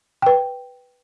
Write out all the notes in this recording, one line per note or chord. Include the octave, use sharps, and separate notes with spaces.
B4 G5